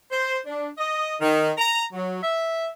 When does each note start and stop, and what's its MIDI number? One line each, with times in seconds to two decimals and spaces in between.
0.10 0.37 72
0.46 0.68 62
0.78 1.13 75
1.21 1.51 51
1.57 1.82 82
1.93 2.21 54
2.22 2.65 76